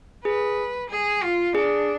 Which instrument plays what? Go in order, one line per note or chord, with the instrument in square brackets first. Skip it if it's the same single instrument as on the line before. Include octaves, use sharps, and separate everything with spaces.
[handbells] G#4 [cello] B4
[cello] G#4
F4
[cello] D4 [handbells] G#4